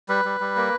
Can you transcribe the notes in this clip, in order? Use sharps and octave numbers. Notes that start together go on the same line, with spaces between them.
G3 B4
G3
G3
A#3